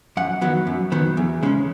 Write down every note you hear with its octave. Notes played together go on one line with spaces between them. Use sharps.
F#2 F#5
D#3 F#3 B3
F#2
D#3 F#3 B3
E2
C#3 G#3 C#4